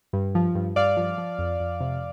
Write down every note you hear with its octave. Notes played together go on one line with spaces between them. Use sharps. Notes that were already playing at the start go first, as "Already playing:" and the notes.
G2
F3
G2
G2 D5 F5
F3
F3
F2
F2
C3